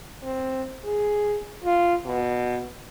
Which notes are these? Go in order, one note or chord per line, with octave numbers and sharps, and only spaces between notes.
C4
G#4
F4
B2